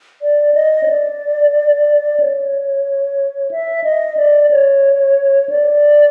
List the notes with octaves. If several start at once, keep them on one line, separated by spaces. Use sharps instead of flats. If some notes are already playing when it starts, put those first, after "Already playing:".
D5
D#5
C#5
D5
C#5
E5
D#5
D5
C#5
D5